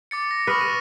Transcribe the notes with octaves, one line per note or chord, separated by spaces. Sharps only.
D6 A6 C#7
A#6
B4 C#6 D#6 F6
D#7